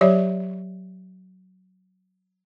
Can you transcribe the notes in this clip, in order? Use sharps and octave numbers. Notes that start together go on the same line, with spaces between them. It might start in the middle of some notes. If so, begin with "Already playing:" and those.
F#3 G4 C#5 D5 E5